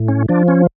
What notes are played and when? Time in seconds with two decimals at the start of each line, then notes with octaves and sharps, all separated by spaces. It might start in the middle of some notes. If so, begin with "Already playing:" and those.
Already playing: A2
0.08 C#4
0.29 F3 D4
0.48 C#4